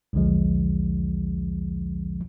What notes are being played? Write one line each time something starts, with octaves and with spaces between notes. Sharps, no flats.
B1 E2 D3 F3 G#3